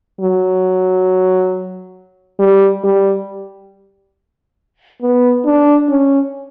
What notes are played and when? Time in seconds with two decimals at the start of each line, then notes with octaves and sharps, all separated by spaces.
0.21 F#3
2.40 G3
2.84 G3
5.02 B3
5.45 D4
5.89 C#4